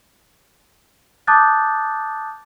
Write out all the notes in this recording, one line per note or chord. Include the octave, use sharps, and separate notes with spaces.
A5 D6 D#6 F#6 G6 A6